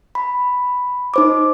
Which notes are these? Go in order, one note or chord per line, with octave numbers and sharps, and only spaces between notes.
B5
D#4 C5 D6